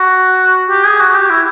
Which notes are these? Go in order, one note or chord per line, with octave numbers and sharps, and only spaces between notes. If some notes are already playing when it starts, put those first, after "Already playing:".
Already playing: F#4
G4
G#4
F#4
G4
E4